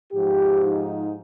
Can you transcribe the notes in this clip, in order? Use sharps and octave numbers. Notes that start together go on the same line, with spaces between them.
G#2 F3 G4
D#4